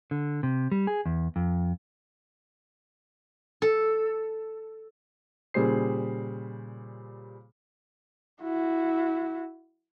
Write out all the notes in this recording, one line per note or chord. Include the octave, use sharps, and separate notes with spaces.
D3
C3
G3
G#4
E2
F2
A4
A#2 C#3 G3 G#4 C5 C7
E4 F#4